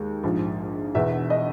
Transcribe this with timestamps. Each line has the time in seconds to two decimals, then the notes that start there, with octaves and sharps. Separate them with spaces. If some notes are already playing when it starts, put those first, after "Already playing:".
Already playing: D#2 G#3
0.23 A#1 G#2 F3
0.95 E1 E2 B2 E5
1.30 D#5